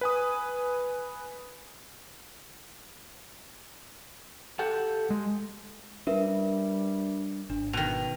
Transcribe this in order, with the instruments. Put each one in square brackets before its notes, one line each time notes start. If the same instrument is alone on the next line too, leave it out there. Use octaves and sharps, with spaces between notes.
[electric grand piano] B4 G#5 D#6
[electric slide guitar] G4 A4 F#5
[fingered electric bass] G#3
[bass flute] G3 [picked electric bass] C#4 D4 [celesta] A#4 B4 E5
[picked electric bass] G#1 [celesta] D4
[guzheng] B2 D#3 [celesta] F7